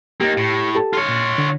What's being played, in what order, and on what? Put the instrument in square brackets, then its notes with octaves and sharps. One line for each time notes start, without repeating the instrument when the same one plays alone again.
[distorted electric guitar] A#3 D#4 [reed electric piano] G4
[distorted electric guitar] A2
[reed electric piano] G4 A4 A5
[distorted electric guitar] F4 C#5
[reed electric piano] A#2
D3